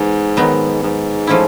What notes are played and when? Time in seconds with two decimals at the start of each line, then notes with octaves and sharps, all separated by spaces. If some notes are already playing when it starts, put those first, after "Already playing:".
Already playing: G#2 E3 B3
0.37 D#3 F#3 B3
0.83 G#2
1.27 F3 A3 C#4 E4